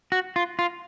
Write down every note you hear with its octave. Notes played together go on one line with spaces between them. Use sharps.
F#4
F4
F4